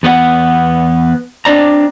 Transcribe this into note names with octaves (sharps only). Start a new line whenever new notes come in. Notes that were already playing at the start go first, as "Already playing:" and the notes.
E2 B3 D#4 F#5
C4 D4 D5 A#5